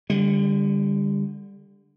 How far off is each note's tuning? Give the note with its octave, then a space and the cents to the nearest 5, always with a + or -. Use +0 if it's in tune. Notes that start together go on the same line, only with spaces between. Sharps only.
D3 +0 G3 +30